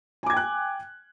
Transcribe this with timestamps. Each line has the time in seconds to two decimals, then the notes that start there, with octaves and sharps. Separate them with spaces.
0.23 G#5
0.26 D6
0.30 G#6
0.33 G5
0.37 F#6